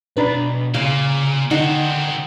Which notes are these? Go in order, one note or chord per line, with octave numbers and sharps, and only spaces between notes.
B2 D4 B4 A#5
A#2 C#3 F5
D3 D#3 C4 D#4 F#5